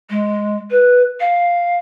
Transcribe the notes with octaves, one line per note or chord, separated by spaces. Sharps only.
G#3
B4
F5